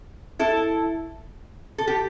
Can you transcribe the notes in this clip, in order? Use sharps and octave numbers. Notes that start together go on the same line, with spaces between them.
E4 A4
A4
G4